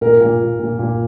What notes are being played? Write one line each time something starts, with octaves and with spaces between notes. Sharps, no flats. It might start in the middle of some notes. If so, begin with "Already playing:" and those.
A#2 A#4
A#2
A#2
A#2
A#2